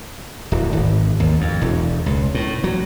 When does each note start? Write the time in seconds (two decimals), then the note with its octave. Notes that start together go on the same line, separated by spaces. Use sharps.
0.52 D1
0.73 G#1
1.20 D#2
1.41 F2
1.61 E1
2.06 C#2
2.35 A2
2.64 F#3